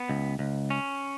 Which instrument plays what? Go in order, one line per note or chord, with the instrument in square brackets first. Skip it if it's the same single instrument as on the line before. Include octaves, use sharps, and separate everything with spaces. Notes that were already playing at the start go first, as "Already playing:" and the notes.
Already playing: [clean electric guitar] B3
C#2
C#2
C#4